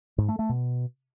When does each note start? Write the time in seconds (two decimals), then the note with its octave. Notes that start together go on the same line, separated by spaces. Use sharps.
0.18 G#2
0.29 A3
0.39 A3
0.49 B2